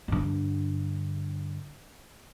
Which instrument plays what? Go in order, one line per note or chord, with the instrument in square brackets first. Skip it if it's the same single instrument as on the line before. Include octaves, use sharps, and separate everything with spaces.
[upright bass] G2 D3